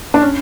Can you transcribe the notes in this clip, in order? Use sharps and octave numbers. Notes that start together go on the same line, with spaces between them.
D4
C#4